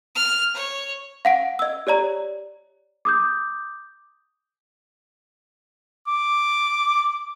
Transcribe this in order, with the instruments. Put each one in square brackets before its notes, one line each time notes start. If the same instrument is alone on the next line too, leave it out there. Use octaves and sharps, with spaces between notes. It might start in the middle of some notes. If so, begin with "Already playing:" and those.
[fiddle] F6
C#5
[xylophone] F5 F#5 D7
D#5 E6
G4 C#5 D5 A#5
[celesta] D6 D#6 G6
[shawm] D6